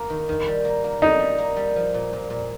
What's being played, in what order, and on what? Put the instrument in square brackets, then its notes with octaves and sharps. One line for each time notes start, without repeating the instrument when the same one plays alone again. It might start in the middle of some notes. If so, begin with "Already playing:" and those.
Already playing: [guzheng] A#3
D#3
D#3
G3
A#3
A#3
[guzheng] G3 [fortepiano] D#4
[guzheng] G3
A#3
G3
F3
A#2
A#2
A#2